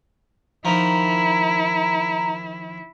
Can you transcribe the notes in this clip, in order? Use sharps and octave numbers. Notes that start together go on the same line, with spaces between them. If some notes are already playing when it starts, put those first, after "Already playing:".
D#3 F3 E4 A#5